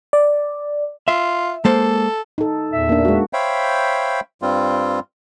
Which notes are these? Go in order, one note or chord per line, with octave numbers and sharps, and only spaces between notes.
D5
F4 E5
G#3 A#3 A4 C5
D#4 A4
E2 A#2 E5
A#3 D4
G#3 F#4
C5 C#5 E5 F5 G5 B5
G2 G3 C4 F4